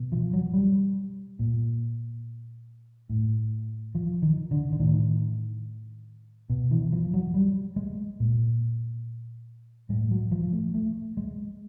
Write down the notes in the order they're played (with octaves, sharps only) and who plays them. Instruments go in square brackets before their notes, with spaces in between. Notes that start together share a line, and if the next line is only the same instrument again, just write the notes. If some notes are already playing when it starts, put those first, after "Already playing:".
Already playing: [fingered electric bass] B2
F3
F#3
G3
A#2
A2
F3
D#3
D3
D3
A2 D#3
B2
E3
F3
F#3
G3
G#3
A#2
A2 G#3
F#3
F3
A3
A3
G#3